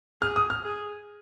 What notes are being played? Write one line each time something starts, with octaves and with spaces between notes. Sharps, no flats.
G#4 F6
D#6
F6
G#4